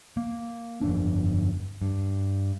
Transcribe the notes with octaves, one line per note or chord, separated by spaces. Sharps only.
A#3
G1 F2 D4
G2